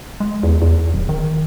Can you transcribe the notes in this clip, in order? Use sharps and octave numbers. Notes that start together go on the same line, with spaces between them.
G#3
E2
E2
D1
D#3